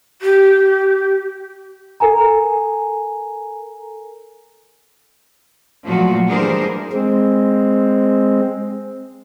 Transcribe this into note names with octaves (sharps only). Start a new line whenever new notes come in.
G4
A4 A#4 G#5 A#5
A#2 F3 F#3 A3 F4 F#4
E3 G3 D4 G#4 A#4 C5
G#3 C4